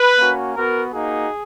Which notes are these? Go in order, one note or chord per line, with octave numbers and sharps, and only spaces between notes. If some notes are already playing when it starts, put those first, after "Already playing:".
Already playing: B4
A#3 C#4 F#4
B3 F#4 A#4
A#3 D#4 F#4 G#4